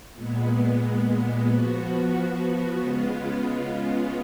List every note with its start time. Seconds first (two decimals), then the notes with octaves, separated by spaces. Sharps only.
0.14 A#2 G#3 B3
1.47 F3 B3 F#4
2.79 C#3 G#3 B3 F4